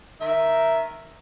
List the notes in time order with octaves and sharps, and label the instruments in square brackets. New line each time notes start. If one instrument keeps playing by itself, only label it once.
[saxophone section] D#3 E5